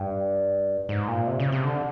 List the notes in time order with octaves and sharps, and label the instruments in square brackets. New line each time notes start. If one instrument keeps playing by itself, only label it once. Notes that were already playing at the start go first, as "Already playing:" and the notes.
Already playing: [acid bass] G2
G#2
A#2
C3
C#3
C3
D3